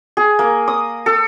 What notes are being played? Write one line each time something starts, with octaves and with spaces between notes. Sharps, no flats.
G#4
A#3
D#6
A4